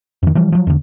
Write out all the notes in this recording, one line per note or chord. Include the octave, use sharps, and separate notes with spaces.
F2 D#3
E3 F3 G3
F3 F#3
E2 D3